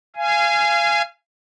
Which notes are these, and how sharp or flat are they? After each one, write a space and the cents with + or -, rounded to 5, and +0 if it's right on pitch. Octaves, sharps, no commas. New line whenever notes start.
F5 -30 G#5 +0